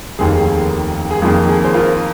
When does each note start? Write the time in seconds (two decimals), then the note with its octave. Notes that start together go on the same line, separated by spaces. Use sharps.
0.19 F1 D#2 D#3 G#4
1.10 G#4
1.22 F2 D#3 A#3 F4
1.49 G#4
1.64 C5
1.74 F4 A#4